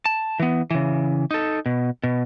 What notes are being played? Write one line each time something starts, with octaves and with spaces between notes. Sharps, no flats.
A5
E3 B3
C#3 E3
D#4 A4
B2
B2